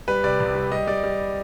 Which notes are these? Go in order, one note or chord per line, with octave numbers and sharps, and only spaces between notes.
G3 B4
C3 D5
C2
G3
G3 D#5
G3 D5
G3